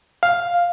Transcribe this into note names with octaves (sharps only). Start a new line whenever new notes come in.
F5